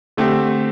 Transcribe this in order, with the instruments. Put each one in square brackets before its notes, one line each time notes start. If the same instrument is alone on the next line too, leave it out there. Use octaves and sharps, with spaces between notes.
[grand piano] D3 A3 C4 G4